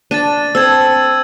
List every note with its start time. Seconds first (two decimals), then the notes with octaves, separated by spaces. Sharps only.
0.11 D4 A5 A6 D#7
0.55 C4 A4 E6 G#6